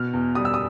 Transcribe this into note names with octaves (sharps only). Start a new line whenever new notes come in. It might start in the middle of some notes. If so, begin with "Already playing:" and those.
Already playing: B2 F6
E2
G3 D#6
E6
D#6